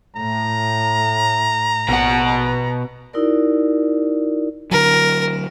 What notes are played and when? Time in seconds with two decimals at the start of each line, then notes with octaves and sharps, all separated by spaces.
0.16 A2 A#5
1.88 A#1 B2 F#5
3.13 D#4 E4 F#4 A#4 D5
4.71 D3 F#3 A#4